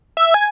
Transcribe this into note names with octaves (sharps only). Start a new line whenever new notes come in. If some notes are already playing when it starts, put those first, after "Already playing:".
E5
G#5